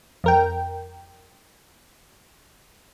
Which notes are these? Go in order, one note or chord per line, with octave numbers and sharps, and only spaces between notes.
F2 A#4 G5